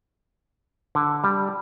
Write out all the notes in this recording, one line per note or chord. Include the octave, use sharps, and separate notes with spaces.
D3
G3